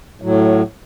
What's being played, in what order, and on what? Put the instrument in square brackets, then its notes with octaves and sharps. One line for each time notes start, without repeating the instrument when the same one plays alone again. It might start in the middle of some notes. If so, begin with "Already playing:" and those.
[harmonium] A2 F#3